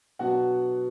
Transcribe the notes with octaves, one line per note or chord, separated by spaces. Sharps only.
B2 F#3 B3 D4 F#4 F#5